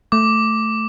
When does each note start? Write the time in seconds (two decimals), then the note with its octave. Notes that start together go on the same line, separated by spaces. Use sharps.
0.12 A3 D6